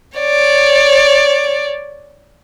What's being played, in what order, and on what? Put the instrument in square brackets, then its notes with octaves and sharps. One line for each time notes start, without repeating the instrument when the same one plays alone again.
[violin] C#5 D5